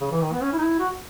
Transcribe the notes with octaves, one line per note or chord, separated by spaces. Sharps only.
C#3
E3
D#3
B3
C#4
E4
D#4
E4
F#4